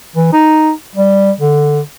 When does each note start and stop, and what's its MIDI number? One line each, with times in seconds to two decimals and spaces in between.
0.16 0.28 52
0.33 0.72 63
0.96 1.31 55
1.40 1.80 50